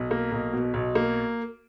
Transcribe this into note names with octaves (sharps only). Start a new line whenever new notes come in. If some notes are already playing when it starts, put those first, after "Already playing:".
Already playing: B1
A#3
B1
B2
B1
A#3